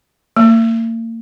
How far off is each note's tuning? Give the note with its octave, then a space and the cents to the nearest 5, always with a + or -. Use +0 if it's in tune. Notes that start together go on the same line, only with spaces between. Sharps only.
A#3 -40